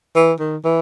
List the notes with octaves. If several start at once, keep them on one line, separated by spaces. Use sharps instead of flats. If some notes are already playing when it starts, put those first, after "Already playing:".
E3
D#3
E3